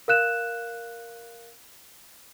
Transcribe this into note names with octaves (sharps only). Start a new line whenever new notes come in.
A#4 F5 F#6 E7